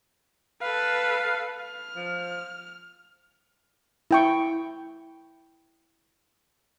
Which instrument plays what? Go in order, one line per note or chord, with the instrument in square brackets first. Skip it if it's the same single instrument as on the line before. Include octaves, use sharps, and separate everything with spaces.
[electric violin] A4 B4 [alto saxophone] F5
[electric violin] F6
[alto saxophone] F3
[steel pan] E4 G5 C#6